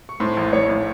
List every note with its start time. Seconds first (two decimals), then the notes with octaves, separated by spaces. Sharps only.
0.09 C#6
0.20 A2 C5 C6
0.37 A#1
0.53 A2 C#5 C#6
0.69 A2